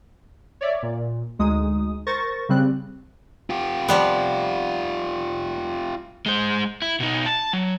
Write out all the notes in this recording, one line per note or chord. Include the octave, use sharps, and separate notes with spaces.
C#5 D5 E5
A#2
D2 G#3 D#4 D#6
A#4 C5 C#6 A6 A#6
C#3 G3 C4 F#6
F4 G4
F3 G3 B3
G#3 C5
E4
B2 D#4
A5
F#3